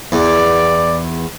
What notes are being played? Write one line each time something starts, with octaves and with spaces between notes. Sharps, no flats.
E2 D5